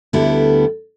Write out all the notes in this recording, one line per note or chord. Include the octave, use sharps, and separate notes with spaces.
D2 D3 G3 B3 E4